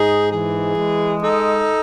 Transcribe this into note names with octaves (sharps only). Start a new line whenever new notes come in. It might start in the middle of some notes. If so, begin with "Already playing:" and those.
Already playing: G#2 D#4 G#4
E3 G#4
G#3
D#4 A4